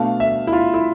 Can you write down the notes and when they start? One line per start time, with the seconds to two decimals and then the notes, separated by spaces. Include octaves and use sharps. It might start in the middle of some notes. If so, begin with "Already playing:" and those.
Already playing: B2 A3 D4 F5
0.20 E5
0.47 E4
0.53 F4
0.74 E4